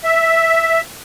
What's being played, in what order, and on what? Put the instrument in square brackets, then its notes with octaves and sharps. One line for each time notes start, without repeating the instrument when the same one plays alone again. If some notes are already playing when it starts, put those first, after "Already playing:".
[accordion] E5